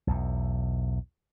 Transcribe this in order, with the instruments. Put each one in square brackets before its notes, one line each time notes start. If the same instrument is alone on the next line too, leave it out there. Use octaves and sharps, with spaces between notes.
[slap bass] B1 E2